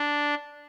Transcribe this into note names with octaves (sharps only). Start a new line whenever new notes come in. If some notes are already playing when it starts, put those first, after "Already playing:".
Already playing: D4